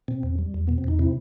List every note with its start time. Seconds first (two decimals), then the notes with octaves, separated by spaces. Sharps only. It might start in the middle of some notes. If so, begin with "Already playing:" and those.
0.08 B2 C4
0.23 E2
0.38 G3
0.54 E2
0.67 B2 B3
0.78 C4
0.84 E2 D#4
0.99 C3 C4 E4